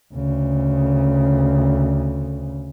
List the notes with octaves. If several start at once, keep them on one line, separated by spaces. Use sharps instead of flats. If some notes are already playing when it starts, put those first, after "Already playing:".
D2 C#3